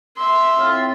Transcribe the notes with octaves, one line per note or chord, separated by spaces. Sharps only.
E5 C6
A2 C4 F4